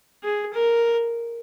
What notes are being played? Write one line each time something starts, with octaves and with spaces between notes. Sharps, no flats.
G#4
A#4